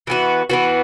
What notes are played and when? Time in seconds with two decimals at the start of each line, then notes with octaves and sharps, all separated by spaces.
0.07 E3 B3 F#4
0.50 E3 B3 F#4